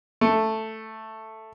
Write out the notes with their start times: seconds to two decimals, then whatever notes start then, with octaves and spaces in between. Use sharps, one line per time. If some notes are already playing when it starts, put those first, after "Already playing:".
0.21 A3